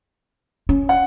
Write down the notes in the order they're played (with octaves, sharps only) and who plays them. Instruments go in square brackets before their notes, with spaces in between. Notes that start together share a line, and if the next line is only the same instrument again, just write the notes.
[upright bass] C#4
[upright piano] F#5